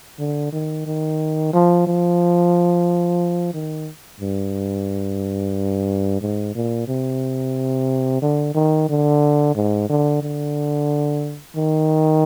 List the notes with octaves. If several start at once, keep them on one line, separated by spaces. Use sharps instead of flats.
D3
D#3
D#3
F3
F3
D#3
G2
G#2
A#2
C3
D3
D#3
D3
G#2
D3
D3
D#3